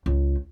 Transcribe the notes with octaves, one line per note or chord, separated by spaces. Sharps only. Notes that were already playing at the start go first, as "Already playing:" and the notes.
C#2